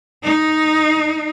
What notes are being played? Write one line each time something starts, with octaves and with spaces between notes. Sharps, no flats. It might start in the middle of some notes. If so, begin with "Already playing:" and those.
D#4